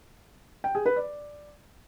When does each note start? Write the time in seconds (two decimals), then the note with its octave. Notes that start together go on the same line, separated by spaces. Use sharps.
0.64 G5
0.75 G#4
0.86 B4
0.96 D5